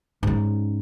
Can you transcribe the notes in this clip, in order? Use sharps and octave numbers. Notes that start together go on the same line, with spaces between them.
G#2 C#4